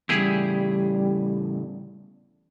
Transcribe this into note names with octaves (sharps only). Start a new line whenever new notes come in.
E2 A2 C#3 G3 E4 G4 G#4